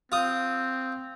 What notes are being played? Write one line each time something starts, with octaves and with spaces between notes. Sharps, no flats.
C4 F4 D#6